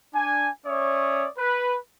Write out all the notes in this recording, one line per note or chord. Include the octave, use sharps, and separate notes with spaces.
D4 G#5
C#4 C#5 D5 E5 D#6
B4